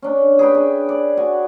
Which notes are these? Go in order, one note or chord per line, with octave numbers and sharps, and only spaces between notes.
C#4 D4
G#4 B4 G5
D4
D5
F#4 G#5